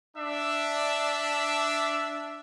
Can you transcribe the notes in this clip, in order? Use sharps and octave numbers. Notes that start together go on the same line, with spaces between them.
D4 E5